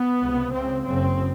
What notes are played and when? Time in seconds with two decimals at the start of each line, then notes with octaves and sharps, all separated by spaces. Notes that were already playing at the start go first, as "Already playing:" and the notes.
Already playing: B3
0.21 C#2 C3
0.53 C#2 C#3 C4
0.85 F#1 F#2 C#3 C4